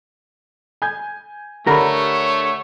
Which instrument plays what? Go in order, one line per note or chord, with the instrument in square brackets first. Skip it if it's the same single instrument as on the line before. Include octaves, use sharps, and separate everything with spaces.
[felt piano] G#5 G6 G#6
[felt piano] D3 [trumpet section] A3 C#5 [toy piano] G4 A4 B5 [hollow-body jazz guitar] A#4